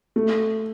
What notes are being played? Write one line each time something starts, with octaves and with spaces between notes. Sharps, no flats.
A3